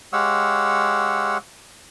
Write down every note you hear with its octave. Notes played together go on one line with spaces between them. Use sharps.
G#3 G4 C#5 F5 F#5 E6